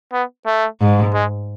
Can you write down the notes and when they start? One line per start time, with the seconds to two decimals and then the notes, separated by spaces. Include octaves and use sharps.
0.13 B3
0.46 A3
0.81 G#2
1.14 G#3